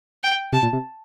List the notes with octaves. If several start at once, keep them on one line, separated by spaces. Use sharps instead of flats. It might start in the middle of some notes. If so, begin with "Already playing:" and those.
G5
C3 A5
A#2
C3